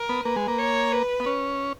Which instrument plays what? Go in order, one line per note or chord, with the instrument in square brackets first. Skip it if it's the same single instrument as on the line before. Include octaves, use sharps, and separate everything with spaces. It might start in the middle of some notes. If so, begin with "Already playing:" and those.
Already playing: [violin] A#4
[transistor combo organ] B3
[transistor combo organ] A#3 [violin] B4
[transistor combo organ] G#3
A#3
[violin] C#5
B4
[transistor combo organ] B3
C#4